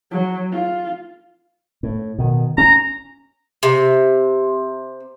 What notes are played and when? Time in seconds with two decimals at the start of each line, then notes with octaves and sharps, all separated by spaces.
0.11 F#3
0.52 F4
1.83 A2
2.19 B2 D#3
2.58 C#4 A#5
3.63 C3